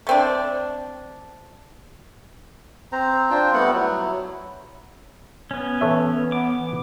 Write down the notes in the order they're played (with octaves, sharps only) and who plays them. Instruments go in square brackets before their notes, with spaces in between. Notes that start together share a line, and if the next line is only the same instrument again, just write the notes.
[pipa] A3 C4 D4
[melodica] C4 C5 A#5
D4 F4 C5 G5
G3 A3 B3 F#5
F#3 E4
[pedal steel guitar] B3 C#4
[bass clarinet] E3 [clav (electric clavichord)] A4 C#5 E5
[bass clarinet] B3 [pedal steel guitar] D6
[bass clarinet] E3